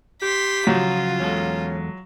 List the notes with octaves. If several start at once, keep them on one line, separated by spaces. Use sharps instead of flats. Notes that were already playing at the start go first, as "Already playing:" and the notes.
G4 C6 B6
C#3 F3 F#3 F4 F#4
E2 G#3 C#4 A4